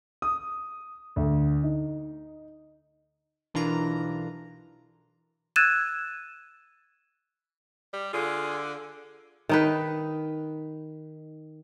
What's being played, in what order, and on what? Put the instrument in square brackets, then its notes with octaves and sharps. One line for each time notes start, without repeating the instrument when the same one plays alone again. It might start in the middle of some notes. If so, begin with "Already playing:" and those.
[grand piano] D#6
D2
D#4
[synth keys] B1 E3 D4 F4 A#4 A#5
[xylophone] E6 F#6 G#6 A6 D#7 E7
[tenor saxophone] G3
[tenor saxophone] D3 [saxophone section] F4 G#4
[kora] D#3 D#4 B4